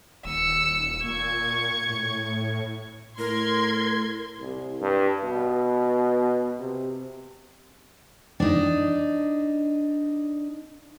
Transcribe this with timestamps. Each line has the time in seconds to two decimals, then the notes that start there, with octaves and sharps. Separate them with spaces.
0.25 D#1 E6 C#7
1.04 A#2 C#6 G#6
1.89 A2
3.19 A2 A#4 C6 G#6
4.40 C2
4.81 G2
5.24 B2
6.59 C3
8.40 D4 D#4